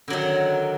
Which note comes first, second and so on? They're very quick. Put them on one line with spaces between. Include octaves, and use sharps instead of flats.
D3 F#3 D#3